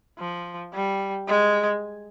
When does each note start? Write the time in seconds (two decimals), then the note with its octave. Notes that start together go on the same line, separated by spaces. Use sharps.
0.18 F3
0.73 G3
1.27 G#3